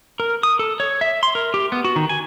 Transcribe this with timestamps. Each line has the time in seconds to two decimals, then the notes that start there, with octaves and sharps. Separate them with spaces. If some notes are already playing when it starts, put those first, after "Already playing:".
0.20 A#4
0.43 D#6
0.59 A4
0.80 C#5
1.01 E5
1.23 C6
1.35 A#4
1.54 G4
1.72 B3
1.84 F#4
1.96 D#3
2.09 G#5